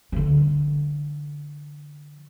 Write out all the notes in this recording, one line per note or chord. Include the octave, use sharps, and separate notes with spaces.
D3 E3